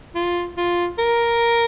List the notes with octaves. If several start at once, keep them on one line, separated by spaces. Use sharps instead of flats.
F4
F4
A#4